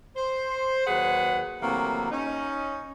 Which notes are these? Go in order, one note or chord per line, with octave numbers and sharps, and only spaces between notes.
C5
D#2 F#3 G#4 B4 F#5
C3 E3 F#3 A3 A#3 F#4
C#4 D#4